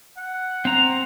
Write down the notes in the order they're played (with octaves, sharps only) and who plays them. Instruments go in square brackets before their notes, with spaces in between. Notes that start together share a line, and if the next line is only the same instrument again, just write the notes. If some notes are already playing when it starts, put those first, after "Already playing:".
[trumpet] F#5
[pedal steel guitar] C4 A#5